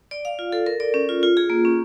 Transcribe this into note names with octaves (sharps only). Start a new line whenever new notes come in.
D5
F5
F4
A4
A#4
D5
C#4
F4
F4
G#4
A#3
C#4